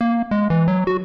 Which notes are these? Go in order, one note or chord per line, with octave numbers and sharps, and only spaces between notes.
A#3
G#3
E3
F#3
F#4